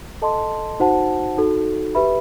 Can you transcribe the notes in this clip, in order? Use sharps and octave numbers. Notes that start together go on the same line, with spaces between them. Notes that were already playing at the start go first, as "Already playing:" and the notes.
A4 D#5 A5 C6
D#4 F#4 C5 F#5 A5
D#4 F#4 A4
G4 B4 E5 B5